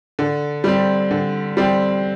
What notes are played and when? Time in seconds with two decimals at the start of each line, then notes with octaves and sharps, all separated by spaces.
0.19 D3
0.64 G3 C4
1.11 D3
1.57 G3 C4